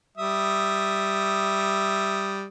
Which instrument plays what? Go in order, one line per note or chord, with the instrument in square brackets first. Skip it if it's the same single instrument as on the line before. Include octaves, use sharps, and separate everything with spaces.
[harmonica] G3 E5 D#6